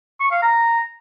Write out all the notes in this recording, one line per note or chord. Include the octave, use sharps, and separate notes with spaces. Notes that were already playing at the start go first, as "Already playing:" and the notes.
C#6
F5
A#5